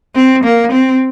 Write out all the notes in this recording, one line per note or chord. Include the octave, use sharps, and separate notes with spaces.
C4
A#3
C4